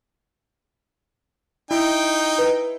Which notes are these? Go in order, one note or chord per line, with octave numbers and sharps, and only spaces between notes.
D#4 E4 G5
B4